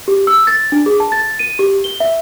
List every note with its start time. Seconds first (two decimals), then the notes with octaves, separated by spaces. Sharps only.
0.08 G4
0.27 E6
0.47 A6
0.72 D4
0.86 G#4
1.00 A5
1.12 A6
1.39 D#7
1.59 G4
1.84 G7
2.00 E5